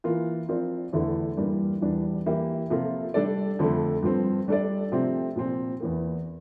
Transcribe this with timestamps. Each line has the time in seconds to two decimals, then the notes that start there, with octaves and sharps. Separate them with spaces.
0.04 E3 A#3 F4 A#4
0.49 F3 C4 F4 A#4 D5
0.93 E2 D3 A3 E4
1.37 G2 E3 G3 A#3 D4
1.81 E2 E3 G3 D4
2.26 E3 A#3 E4 G4
2.70 C3 F3 A#3 F4 A4
3.14 G3 D4 A4 D5
3.59 F2 D3 A3
4.03 G2 F3 C4
4.48 G3 D4 A4 D5
4.92 C3 F3 A3 C4 G4
5.36 A#2 F3 C4
5.80 E2 E3 A#3